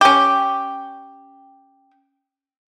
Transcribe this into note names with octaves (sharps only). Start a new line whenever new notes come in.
C#4 G4